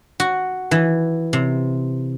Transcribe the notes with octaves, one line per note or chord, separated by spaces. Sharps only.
F#4
E3
C3